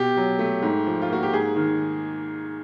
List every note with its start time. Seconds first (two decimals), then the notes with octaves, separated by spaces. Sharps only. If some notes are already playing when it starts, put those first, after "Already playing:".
Already playing: B2 G4
0.17 F#3
0.39 A3
0.62 G#2
0.87 F3
1.02 F4
1.10 A#3 F#4
1.23 G4
1.33 G#2 G#4
1.56 D#3